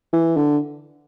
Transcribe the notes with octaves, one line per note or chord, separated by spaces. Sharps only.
E3
D3